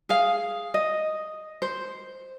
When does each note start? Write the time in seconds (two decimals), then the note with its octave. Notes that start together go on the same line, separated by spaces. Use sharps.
0.09 G#4 F5
0.74 D#5
1.62 C5